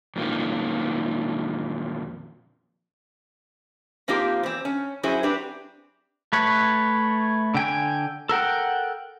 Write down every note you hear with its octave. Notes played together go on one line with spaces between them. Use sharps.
F2 A#2 D#3
F3 A#3 C4 D#4 F4 G4
E2 C4
C#4
F#3 C#4 E4 G#4 C5
C4 D4 G4 B4
A3 B4 C#5
D3 G5 G#5
A4 A#4 F#5 G5